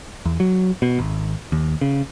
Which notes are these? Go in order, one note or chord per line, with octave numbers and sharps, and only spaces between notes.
E2
F#3
B2
G#1
D#2
C#3